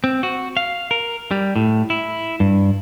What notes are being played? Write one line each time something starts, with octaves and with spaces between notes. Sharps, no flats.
C4
F#4
F5
A#4
G3
A2
E4
G2